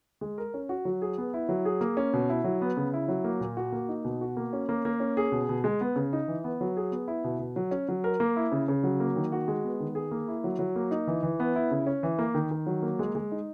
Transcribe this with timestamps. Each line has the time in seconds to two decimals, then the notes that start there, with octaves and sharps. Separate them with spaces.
0.21 G#3
0.38 A#4
0.54 C#4
0.69 F#4
0.85 F#3
1.02 G#4
1.18 B3
1.34 E4
1.49 F#3
1.65 G#4
1.81 A#3
1.97 C#4
2.13 B2
2.29 E4
2.44 F#3
2.61 B3
2.77 C#3
2.93 E4
3.08 F#3
3.24 A#3
3.41 A#2
3.57 F#4
3.72 A#3
3.89 D#4
4.04 B2
4.21 F#4
4.37 A#3
4.53 C#4
4.69 A#3
4.85 A#3
5.00 C#4
5.17 G#4
5.32 B2
5.49 B2
5.64 G#3
5.81 B3
5.96 C#3
6.13 D#4
6.28 E3
6.44 B3
6.61 F#3
6.77 G#4
6.92 B3
7.08 E4
7.24 B2
7.39 B2
7.56 F#3
7.71 C#4
7.89 F#3
8.04 A#4
8.20 A#3
8.36 E4
8.52 C#3
8.68 C#3
8.84 F#3
9.00 A#3
9.16 D#3
9.32 F#4
9.48 G#3
9.64 B3
9.80 D#3
9.95 G#4
10.11 A#3
10.28 E4
10.44 F#3
10.59 F#3
10.76 A#3
10.91 D#4
11.07 E3
11.23 E3
11.40 B3
11.56 E4
11.71 C#3
11.87 C#4
12.03 E3
12.19 A#3
12.35 D#3
12.51 D#3
12.67 F#3
12.83 A#3
12.99 G#3
13.15 G#3
13.32 D#4